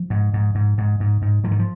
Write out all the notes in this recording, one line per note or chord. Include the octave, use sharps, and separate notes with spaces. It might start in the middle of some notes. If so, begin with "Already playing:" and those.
Already playing: F3
G#2
G#2
G#2
G#2
G#2
G#2
G#2 F3
D#3
F3